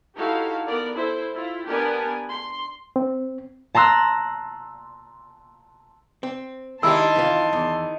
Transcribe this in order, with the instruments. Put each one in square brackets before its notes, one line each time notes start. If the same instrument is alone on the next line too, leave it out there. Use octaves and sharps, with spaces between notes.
[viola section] D#4 E4 F#4 G4 A4 F5
B3 A#4 D5
E4 A4 C5
E4 F4
B3 D4 G4 A#4 B4 G#5
C6
[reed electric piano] C4
[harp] A5 A#5 C6 E6 F#6
[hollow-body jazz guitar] C4
[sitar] D#3 E4 [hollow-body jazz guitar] G#3 D4 G4 [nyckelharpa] A5 C6 [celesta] E6
[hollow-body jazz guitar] F2 E3 F4
E2